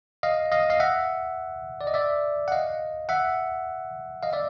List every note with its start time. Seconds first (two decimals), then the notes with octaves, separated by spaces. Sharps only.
0.23 D#5 F5
0.52 D#5 F5
0.70 D#5 F5
0.80 E5 F#5
1.81 D5
1.87 D#5
1.94 D5 E5
2.48 F#5
2.52 D#5 F5
3.09 E5 F#5
4.23 D#5 F5
4.33 D5 E5